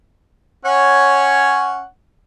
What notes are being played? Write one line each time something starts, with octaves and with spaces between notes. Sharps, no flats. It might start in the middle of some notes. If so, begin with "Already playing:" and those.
C#4 C#5 F#5